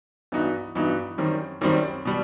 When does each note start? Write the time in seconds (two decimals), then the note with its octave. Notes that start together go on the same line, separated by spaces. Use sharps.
0.32 G2 E3 B3 D#4 F#4
0.75 G2 E3 B3 D#4 F#4
1.18 F#2 D#3 G3 C4
1.61 F#2 D#3 G3 C4
2.05 B2 G3